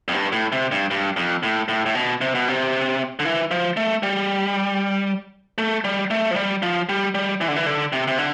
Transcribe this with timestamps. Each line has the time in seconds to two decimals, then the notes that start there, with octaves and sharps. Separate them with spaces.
0.08 F2
0.13 G2
0.32 A2
0.52 C3
0.72 G2
0.91 G2
1.17 F2
1.43 A2
1.68 A2
1.86 A2
1.95 B2
2.21 C3
2.35 B2
2.48 C3
3.19 D3
3.25 E3
3.51 F3
3.77 A3
4.03 G3
5.58 A3
5.85 G3
6.11 A3
6.31 F3
6.36 G3
6.62 F3
6.89 G3
7.15 G3
7.41 E3
7.48 D3
7.56 E3
7.66 D3
7.93 C3
8.07 C3
8.18 D3